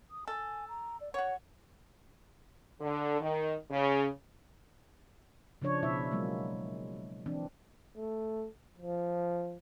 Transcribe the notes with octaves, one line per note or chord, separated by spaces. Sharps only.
D#6
A4 G#5
A#5
D5
F#4 C#5 F#5
D3
D#3
C#3
C#3 F3 D4 C#5
B2 E4 E5
F#3 G#3 A#3
E3 C4 D4
A3
F3